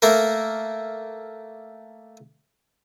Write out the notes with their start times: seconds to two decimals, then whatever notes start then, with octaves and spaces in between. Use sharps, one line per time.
0.02 A3 A#3 A#4